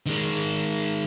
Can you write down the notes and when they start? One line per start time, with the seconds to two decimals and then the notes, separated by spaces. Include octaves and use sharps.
0.06 D#3 G#3